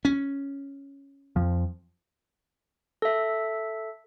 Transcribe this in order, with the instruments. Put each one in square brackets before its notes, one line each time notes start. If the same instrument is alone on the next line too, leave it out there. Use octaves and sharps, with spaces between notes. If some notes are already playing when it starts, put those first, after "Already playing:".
[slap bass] C#4
[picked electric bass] F2 F3
[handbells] A4 E5